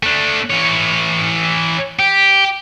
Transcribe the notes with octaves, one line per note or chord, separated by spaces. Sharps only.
A3 D4
E3 C#5
G4